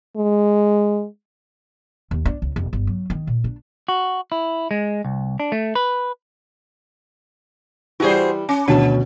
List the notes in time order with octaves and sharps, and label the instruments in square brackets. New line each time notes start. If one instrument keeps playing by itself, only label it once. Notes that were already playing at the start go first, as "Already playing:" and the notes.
[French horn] G#3
[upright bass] D#2
D4
C#2
F1
G1
F#3
D#3
A#2
D4
[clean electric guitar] F#4
E4
G#3
C2
D4
A3
B4
[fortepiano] E3 G3 [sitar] F#4 G#4 C5
[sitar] C#4
[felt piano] D2 B2 [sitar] D#3 [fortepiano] C#4 A5